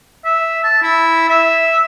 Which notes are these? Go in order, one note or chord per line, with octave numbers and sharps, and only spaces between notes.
E5
A5
E4
E5